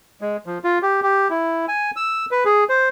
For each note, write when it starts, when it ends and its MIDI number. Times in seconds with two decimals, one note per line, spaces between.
0.21 0.37 56
0.46 0.58 53
0.64 0.79 65
0.82 1.00 67
1.03 1.28 67
1.30 1.66 64
1.68 1.91 80
1.96 2.26 88
2.31 2.44 71
2.45 2.64 68
2.69 2.89 72